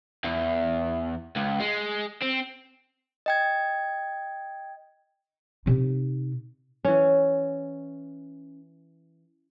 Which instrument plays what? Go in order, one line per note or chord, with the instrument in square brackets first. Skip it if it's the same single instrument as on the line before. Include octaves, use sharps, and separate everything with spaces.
[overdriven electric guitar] E2
C#2
G#3
C4
[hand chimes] D#5 G5 G#6
[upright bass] C3 D#4
[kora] E3 C#4